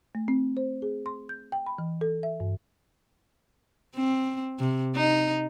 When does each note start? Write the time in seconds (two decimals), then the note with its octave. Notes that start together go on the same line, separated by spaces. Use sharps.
0.15 A3
0.28 C4
0.57 C5
0.82 G#4
1.06 C6
1.29 G6
1.52 G5
1.66 B5
1.78 E3
2.01 A4
2.23 E5
2.40 G2
3.95 C4
4.59 C3
4.95 D#4